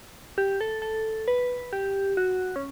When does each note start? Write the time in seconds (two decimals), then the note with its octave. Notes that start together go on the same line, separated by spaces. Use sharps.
0.38 G4
0.61 A4
0.82 A4
1.28 B4
1.73 G4
2.17 F#4
2.56 C#4